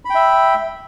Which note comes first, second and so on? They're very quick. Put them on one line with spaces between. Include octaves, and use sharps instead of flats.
B5 G5 E5